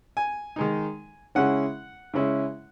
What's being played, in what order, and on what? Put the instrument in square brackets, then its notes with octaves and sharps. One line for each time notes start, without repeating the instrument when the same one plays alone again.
[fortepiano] G#5
D#3 G#3 D#4
C#3 G#3 C#4 E4 F#5
C#3 G#3 C#4 E4